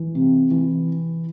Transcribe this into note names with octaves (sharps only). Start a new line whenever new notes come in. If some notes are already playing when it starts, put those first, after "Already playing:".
Already playing: E3
C3
E3